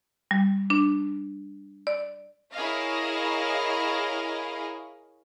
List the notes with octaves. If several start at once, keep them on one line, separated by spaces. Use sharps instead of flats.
G3
D4
D5
E4 G#4 A#4 C#5 D#5 F5